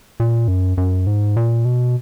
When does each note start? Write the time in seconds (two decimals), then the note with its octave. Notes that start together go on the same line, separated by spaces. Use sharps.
0.20 A#2
0.48 F#2
0.77 F#2
1.07 G#2
1.37 A#2
1.65 B2